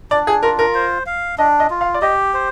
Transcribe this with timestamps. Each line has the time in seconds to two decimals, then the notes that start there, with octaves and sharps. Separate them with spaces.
0.11 D4 D5
0.27 G#4
0.43 F4 A#4
0.59 A#4
0.74 C5
1.06 F5
1.38 D4 D#5
1.60 D#5
1.70 F4
1.81 F5
1.94 D5
2.02 G4 D#5
2.34 C5